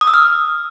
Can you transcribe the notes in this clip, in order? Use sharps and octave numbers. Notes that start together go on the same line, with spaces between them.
D#6
E6
F6